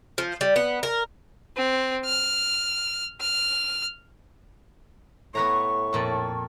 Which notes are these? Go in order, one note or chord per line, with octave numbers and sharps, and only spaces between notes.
F3
G3
B3
A#4
C4
F6
F6
A2 B3 B4 A#5 C#6
F2 A#2 A4